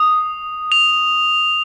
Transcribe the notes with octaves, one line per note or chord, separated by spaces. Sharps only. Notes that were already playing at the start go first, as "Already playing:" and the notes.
Already playing: D#6
F7